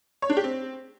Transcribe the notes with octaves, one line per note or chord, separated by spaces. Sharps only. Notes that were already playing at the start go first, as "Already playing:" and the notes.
C#5
D4
G4
C4